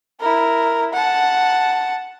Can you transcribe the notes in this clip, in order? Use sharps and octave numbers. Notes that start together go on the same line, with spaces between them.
E4 A#4
F#5 A5